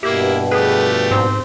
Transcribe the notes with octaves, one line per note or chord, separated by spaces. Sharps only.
G2 B2 A#3 E4 G4
F3 A3 G4 G#4 B4
G#2 C4